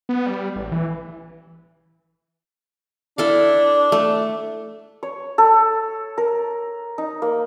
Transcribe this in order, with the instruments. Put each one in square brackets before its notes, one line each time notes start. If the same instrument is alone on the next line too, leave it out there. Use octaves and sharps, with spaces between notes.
[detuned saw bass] B3
G3
A1
E3
[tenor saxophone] D4 [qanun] E4 A4 F5
[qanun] A3
[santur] C#5
A4
A#4
D#4
A#3